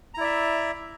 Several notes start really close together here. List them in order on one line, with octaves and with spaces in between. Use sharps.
A#5 E4 D5 E5